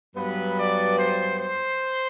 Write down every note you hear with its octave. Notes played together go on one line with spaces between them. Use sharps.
G2 F#3 B3 B4
D5
C5
C5